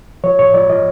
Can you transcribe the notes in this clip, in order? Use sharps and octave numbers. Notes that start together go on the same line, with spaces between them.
F3 C#5
A2 C#5
F3 D5
F3 D#5